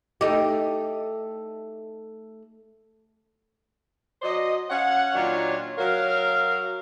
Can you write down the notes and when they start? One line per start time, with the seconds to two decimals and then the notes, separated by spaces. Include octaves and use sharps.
0.21 A3 D#4 G4
4.22 F#3 C5 D5 D#5
4.70 C#4 C#5 F5 F#5
5.14 A#2 D#3 F#3 D4 F4 C#5
5.78 F#3 A#4 F5